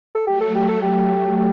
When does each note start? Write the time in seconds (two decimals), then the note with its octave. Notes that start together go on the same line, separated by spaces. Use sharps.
0.15 A4
0.27 F#3 A3 G4
0.41 A4
0.55 G4
0.68 A4
0.82 G4
1.37 G4